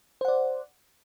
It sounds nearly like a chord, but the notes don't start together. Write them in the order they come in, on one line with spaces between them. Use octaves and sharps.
C5 F#5 D5